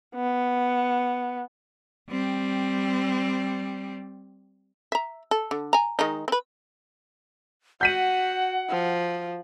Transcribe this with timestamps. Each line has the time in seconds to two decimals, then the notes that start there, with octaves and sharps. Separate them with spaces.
0.15 B3
2.09 G3 C4
4.92 E5 A#5
5.31 A4
5.51 D3
5.73 G#5 A#5
5.99 D#3 G#3 D#4
6.28 C4 B4
7.81 F#4 F#5 G6 B6 D#7
8.70 F3